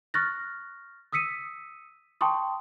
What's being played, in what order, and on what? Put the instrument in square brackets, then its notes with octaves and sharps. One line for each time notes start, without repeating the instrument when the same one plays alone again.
[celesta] C#6 F6 F#6 A6 A#6
D#6 E6 B6 C#7 D#7
G5 A5 C6 C#6 D#6